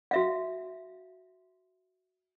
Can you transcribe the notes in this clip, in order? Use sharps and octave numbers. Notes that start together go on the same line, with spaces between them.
F#4 E5 F5